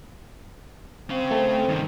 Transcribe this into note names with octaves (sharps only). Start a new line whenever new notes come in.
C4 C#4 F5
A3 A4
G2 C3 D#3